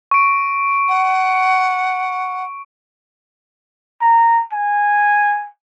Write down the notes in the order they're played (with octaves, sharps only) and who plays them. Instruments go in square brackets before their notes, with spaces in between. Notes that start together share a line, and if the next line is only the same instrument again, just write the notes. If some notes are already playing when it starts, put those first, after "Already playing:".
[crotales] C#6 D7
[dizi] F#5
[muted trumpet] A#5
G#5